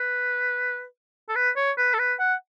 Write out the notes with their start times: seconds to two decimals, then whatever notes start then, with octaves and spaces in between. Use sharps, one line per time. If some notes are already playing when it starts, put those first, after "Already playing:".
Already playing: B4
1.29 A4
1.36 B4
1.57 C#5
1.78 B4
1.94 A4
1.99 B4
2.20 F#5